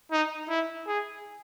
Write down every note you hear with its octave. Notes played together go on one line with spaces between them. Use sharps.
D#4
E4
G#4